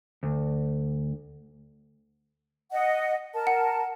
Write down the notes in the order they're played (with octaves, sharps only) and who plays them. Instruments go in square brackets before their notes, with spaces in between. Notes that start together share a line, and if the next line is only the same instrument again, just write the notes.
[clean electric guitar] D2
[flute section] D#5 F#5
A#4 A5
[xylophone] F#5